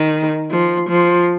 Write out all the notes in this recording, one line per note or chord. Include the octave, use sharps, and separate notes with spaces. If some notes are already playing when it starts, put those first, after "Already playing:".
Already playing: D#3
F3
F3